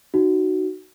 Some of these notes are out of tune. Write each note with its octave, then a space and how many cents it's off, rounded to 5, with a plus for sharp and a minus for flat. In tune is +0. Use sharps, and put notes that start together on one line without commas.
D#4 -20 F#4 +10